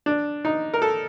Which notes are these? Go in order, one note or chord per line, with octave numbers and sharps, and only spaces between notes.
D4
D#4
A#4
A4